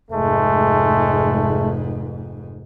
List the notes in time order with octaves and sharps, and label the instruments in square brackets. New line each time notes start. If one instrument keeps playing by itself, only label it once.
[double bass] F1 G#2 [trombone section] G#3 A3